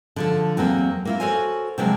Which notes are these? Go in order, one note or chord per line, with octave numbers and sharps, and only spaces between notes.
D3 F3 A4
E2 F#3 A#3 C4
A#3 E4 F4
F#4 A4 A#4 C5 C#5 G#5
C3 F3 F#3 G#3 A#3 D4